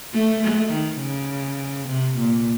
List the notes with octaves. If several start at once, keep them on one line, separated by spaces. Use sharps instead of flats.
A3
A3
D#3
C#3
C3
A#2